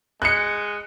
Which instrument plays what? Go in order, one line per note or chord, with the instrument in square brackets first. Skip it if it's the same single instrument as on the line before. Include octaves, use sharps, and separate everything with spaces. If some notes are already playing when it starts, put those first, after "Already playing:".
[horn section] G#3 [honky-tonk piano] F#6 C#7